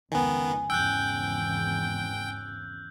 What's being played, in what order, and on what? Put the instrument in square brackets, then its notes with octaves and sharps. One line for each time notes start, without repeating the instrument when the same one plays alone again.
[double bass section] F1 C#2 [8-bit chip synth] D#3 B3 [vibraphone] G#5
[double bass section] G#1 E2 C#3 [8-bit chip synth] G5 [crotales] E6 F#6 G6